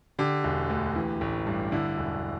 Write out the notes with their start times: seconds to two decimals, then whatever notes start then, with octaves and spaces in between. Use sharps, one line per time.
0.19 D3 G4
0.44 E1
0.70 D2
0.96 E3
1.21 A1
1.47 G2
1.72 D3 E4
1.98 E1